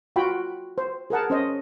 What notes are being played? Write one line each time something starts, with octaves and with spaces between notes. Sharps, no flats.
F4 F#4 G5 B5
C5
G#4 A#4 F#5 A5
C#4 C5 D#5